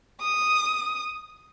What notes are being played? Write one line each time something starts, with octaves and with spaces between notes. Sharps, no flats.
D#6